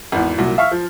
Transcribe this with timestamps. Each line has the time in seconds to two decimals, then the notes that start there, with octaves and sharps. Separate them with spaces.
0.12 G#1 E2
0.38 C2 A#2 F#3
0.58 E5 F5 C#6 F6
0.71 F3